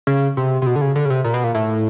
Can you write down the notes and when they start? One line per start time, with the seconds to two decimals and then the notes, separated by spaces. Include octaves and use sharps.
0.07 C#3
0.37 C3
0.62 C3
0.66 B2
0.76 D3
0.81 C#3
0.96 D3
1.05 C#3
1.10 C3
1.24 A#2
1.34 B2
1.44 A#2
1.55 A2